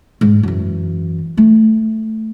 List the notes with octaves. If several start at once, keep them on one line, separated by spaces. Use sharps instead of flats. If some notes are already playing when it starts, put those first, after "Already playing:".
G#2
F#2 E3
A3